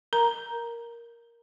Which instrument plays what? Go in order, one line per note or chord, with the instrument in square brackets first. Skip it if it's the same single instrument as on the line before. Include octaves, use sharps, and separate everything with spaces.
[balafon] A#4 A#5